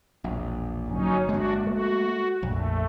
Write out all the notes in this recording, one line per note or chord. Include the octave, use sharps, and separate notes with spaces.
E1 A#1
G1 F#3 C#4 D#4
G#3 A#3 D4 F#4
A3 F#4
A#1 F2 A3